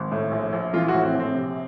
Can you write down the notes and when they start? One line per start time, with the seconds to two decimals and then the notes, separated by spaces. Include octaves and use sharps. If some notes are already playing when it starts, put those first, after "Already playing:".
Already playing: G#1
0.11 A2
0.31 A#1
0.53 A#1
0.73 E3 F4
0.88 F#4
0.94 A2
1.03 C4
1.14 A#1
1.20 C4
1.34 C3